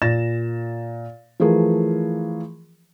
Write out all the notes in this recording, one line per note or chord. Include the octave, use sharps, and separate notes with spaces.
A#2 A6 A#6 E7
E3 F3 A3 G#4 A#4